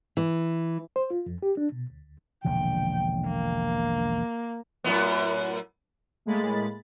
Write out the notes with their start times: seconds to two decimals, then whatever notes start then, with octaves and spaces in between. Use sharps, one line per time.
0.17 E3
0.96 C5
1.10 F4
1.26 F2
1.42 G4
1.57 D4
1.72 B2
1.90 D2
2.45 E1 A#1 D3 G5
3.28 A#3
4.84 F#2 A2 B3
6.26 A2 G#3 A#3 B5 A6